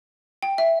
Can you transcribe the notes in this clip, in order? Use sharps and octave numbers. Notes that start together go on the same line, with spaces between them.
G5
E5